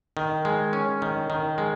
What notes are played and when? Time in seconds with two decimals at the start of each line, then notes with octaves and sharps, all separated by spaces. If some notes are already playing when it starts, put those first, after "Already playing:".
0.17 D#3
0.45 G#3
0.73 C#4
1.02 D#3
1.30 D#3
1.58 G#3